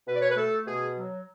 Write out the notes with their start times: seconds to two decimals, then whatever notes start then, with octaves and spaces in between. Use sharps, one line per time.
0.07 B2 B4
0.15 D5
0.22 C#5
0.30 B4
0.37 A3 A4
0.67 B2 G#4
0.97 F#3